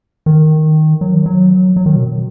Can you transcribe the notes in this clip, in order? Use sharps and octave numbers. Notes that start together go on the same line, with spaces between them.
D#3
F#3
D#3
F#3
F#3
D#3
B2